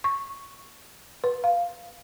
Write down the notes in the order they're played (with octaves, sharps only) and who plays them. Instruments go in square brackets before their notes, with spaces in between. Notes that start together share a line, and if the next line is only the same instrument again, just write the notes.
[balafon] C#6
B4
F5